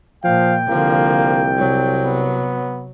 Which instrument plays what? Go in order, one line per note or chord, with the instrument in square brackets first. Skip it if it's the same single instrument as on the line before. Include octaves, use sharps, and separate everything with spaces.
[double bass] A#2 [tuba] F3 [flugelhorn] F5 [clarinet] G5
[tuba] C2 [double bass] D3 F3 [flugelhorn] A#3
[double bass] C3 F#3
[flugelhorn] B3